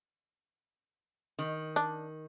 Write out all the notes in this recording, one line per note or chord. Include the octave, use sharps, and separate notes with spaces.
D#3
D4